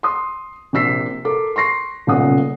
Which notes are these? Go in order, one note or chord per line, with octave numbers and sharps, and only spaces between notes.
C6 D#6
A#1 C3 E6 B6 C7
A4 A#4 D6
C6 C#6 A#6 C7
D#1 B1 A#2 C#3 F#5 D#6